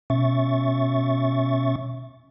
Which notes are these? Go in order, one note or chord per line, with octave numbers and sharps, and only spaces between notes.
B2 C#4 E5 C#6 A6